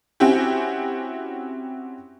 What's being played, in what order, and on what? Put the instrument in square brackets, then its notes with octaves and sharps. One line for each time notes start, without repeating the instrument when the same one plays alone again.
[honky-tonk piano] C4 C#4 E4 F#4 G4